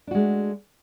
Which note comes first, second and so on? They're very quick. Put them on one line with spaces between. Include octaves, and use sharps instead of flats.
D4 F#4 G#3 A3